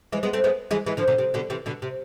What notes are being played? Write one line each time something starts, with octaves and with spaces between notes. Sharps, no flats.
E3 G#3
G#3 B3
A3 C4
G#3 B3
E3 G#3
E3 G#3
D3 F3
B2 D3
C3
B2 D3
C3 E3
B2 D3
C3